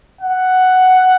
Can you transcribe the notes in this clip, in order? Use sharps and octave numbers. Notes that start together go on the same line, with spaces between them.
F#5